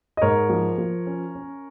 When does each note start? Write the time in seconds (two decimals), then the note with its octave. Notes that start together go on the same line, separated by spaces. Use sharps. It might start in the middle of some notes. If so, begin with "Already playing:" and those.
0.17 D#5
0.22 G#2 A#4 C#5
0.49 F3
0.78 F3
1.07 C#4
1.35 C#4